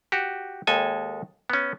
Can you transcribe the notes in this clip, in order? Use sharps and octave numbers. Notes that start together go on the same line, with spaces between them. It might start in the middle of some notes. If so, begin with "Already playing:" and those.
F#4 G4
D#2 G#3 A4 G#5
B3 C#4